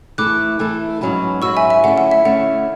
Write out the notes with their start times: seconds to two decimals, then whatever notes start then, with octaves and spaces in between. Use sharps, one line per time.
0.18 E3 A3 E4 A4 D6 F#6
0.59 E3 A3 E4 A4
1.01 G#2 F#3 C#4 F#4 B4
1.42 G#2 F#3 C#4 F#4 B4 C#6 E6
1.57 E5 G#5
1.70 E5
1.84 D3 A3 C#4 E4 F#5
1.98 F#5
2.11 E5
2.25 D3 A3 C#4 E4 F#5